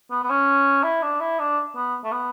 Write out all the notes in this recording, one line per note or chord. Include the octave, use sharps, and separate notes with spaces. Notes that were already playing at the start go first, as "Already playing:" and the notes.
B3
B3
C#4
E4
D4
E4
D4
B3
A3
B3